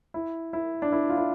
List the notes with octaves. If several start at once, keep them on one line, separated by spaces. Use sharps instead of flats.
E4
E4
D4
E4
F4
E4